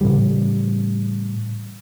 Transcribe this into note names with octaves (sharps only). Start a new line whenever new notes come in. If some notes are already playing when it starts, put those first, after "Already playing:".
A2 C#3 E3 G3